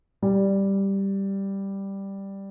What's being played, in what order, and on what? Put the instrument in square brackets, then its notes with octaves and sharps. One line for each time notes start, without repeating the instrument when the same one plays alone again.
[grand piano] G3